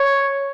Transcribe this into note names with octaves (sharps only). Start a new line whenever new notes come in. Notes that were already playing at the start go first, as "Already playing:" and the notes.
Already playing: C#5